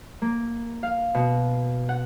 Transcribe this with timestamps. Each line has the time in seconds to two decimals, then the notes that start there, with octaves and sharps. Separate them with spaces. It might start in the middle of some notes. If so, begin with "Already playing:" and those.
0.22 A#3
0.83 F5
1.15 B2
1.89 F#5